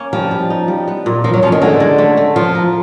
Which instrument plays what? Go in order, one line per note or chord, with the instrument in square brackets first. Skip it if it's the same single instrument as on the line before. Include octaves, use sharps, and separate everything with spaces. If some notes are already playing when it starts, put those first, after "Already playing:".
Already playing: [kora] A#3 C#4
[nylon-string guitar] F3 [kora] G3
[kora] G3
D#4
G3
B3
A#2
[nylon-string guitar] F3 [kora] A#4
[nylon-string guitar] F#3
[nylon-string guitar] F3 [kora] C#4
[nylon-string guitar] D#3
[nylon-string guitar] D3 [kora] G#3
[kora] G#3
A3
A3
[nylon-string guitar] F3 [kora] F4
[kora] A#4